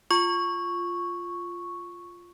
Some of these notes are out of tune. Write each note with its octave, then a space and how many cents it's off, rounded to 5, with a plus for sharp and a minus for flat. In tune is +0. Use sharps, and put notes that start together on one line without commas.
F4 +0 C#6 +0